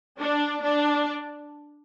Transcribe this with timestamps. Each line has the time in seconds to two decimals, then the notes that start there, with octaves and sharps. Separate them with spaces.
0.18 D4
0.62 D4